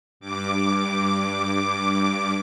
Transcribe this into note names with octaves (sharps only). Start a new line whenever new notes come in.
G2 D6